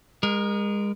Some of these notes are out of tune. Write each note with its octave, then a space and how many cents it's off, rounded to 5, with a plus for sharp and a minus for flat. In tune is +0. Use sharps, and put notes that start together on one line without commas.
G#3 -30 A#4 +15